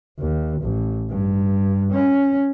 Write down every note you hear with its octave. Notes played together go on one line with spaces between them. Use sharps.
D#2
A1
G2
C#4